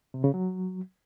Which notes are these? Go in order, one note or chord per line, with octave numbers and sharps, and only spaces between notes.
C3
C#3
F#3